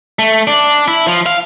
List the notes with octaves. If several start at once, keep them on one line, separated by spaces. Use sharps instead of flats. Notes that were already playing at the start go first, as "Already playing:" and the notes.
A3
D4
E4
F3
F5